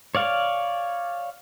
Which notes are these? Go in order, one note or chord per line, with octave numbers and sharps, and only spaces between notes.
C#5 D5 F5